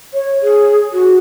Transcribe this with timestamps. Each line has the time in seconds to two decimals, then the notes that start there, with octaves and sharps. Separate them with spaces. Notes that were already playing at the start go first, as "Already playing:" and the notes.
0.14 C#5
0.43 G#4
0.93 F#4